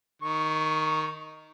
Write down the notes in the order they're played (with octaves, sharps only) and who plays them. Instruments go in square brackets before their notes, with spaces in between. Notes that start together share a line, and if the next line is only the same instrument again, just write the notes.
[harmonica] D#3 C#6